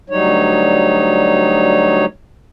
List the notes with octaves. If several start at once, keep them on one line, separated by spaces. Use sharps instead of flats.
D2 F#3 G3 D#4 C#5